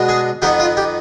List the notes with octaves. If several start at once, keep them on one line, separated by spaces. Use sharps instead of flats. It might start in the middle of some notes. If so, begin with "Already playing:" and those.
Already playing: B2 G#3 B3 D4
G#4
F2 D#3 B3 G4
F4
G4